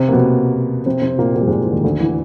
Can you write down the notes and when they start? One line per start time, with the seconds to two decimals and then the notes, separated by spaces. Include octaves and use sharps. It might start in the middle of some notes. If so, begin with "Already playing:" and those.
Already playing: C3 C4
0.08 A#3
0.12 B2 B3
0.86 C3 C4
1.02 C3 C4
1.18 A#2 A#3
1.36 A#2 A#3
1.41 G3
1.47 G#2 G#3
1.64 E3
1.71 D#2 D#3
1.84 D2 D3
2.00 E3